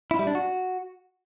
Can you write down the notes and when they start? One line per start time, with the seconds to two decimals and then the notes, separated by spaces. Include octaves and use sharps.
0.11 E4
0.19 G3
0.27 D4
0.35 F#4